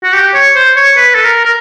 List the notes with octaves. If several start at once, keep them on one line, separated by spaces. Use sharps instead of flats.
F#4
G4
C#5
C5
C#5
B4
A4
A#4
A#4